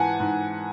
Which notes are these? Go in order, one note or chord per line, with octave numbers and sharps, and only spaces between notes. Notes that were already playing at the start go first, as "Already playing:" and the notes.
Already playing: G#2 E3 F#5 G#5 A5
G#2